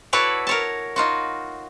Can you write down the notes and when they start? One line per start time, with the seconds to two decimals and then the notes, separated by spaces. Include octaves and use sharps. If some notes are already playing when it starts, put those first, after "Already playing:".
0.13 E4 F#4 A4 B4 C#5 D5
0.47 A#4 C#5 A5
0.96 D#4 F4 F#4